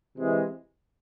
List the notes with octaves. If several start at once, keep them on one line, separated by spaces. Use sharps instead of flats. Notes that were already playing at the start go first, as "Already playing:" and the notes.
C3 E3 G#3